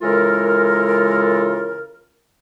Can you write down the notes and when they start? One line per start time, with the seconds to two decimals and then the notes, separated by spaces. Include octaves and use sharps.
0.01 C#3 E3 G#3 F4 A4 A#4